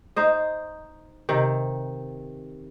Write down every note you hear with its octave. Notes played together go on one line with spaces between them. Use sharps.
D#4 C5 D#5
C3 D#3